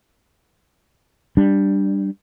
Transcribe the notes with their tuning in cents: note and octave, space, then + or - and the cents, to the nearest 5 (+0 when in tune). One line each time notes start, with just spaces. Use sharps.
G3 +0 D4 +0